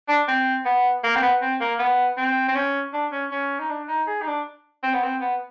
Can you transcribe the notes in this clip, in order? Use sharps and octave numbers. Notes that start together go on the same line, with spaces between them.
D4
C4
B3
A#3
C4
B3
C4
A#3
B3
C4
C4
C#4
D4
C#4
C#4
D#4
D4
D#4
G#4
D#4
D4
C4
B3
C4
B3